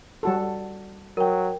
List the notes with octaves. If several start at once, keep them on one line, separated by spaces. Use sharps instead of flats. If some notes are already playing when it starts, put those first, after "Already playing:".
G3 F#4 A4
F#3 A#4 G5